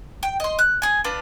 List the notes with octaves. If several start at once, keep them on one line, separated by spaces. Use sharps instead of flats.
G5
D#5 C6
F#6
G#4 G#5
D4 F4 B4